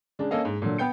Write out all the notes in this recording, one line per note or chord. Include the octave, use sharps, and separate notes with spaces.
C#3 G#3 D4
A#3 C#4 A4 D#5 F5
G#2
A#2 D3 F#3
B3 G5 G6 C#7